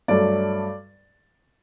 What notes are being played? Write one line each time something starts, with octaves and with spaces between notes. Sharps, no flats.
G2 F#3 A3 D5